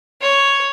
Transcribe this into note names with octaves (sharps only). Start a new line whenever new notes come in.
C#5